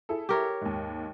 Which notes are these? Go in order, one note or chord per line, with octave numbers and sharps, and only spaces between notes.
E4 G#4 A4
G4 A#4 C#5
D#2 G#2